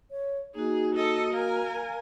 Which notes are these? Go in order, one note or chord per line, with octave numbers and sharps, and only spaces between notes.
C#5
A#3 D#4 F#4 G#4
A4 D#5
A#4 F5 G#5